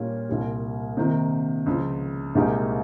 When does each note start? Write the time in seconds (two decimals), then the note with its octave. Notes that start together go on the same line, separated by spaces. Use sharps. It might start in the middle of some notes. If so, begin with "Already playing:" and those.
Already playing: A#2 G3 C#4 F4
0.29 C2 A#2 G3
0.97 C3 D#3 A#3
1.66 C#2 C#3 F3
2.35 C2 A#2 G#3 D#4 G4